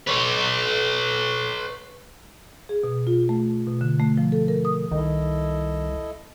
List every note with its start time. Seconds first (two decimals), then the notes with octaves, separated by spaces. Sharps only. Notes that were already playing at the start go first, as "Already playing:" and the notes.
0.08 B4 C#5
2.69 G#4
2.84 B2
3.07 F4
3.29 A3
3.67 B2
3.81 D3
4.00 A3
4.18 F3
4.32 A4
4.48 A#4
4.65 D#6
4.91 C2 D#3 E4 A4 D#5